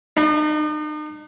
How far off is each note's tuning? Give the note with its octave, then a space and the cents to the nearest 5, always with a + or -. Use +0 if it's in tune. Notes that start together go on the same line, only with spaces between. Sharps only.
D#4 -40